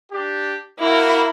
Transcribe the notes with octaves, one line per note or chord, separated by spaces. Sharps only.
D4 G4
A#3 E4 F#4 A#4